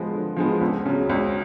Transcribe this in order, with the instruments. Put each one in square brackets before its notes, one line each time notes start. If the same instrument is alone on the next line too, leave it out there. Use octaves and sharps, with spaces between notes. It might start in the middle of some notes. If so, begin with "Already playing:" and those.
Already playing: [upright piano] F3 G#3 B3
D3
F3 G#3 B3
C#2
C#3 F#3
C#2